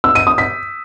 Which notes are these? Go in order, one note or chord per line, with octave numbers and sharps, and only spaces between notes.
E6
D#7
D#6
B6